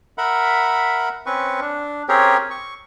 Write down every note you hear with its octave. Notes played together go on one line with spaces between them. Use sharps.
A#4 E5 F#5 B5
C4 C#4 B4 C#6
D4
C4 C#4 G4 G#4 A#4 C#5
C#6